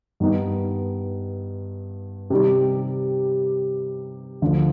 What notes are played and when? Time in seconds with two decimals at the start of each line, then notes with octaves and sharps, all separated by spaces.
0.20 G2 D#3 B3 D#4
2.30 C3 D#3 G3
4.42 D2 D3 F3